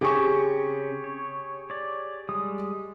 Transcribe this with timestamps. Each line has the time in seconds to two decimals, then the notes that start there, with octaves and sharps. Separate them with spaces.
0.01 C#3 C4 C#4 G4 G#4 C#6
1.04 C#5
1.70 C#5 D5
2.29 G3 G#3 D#6